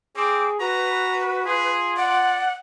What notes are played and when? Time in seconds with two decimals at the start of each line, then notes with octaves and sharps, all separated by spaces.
0.16 C4 G#4 D6
0.60 F#4 B4 A#5
1.46 F4 G#4
1.97 D5 F#5